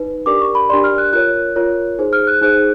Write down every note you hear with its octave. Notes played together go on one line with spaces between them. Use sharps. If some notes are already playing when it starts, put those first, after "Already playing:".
Already playing: D#4 B4
D4 G4 A#4 D5 D6
C#6
B5
D4 G4 A#4 D5 C6
F6
F#6
F4 A#4 C#5 F#6
F4 A#4 C#5
D#4 G#4 C5
F6
F#6
D#4 G#4 C5 F#6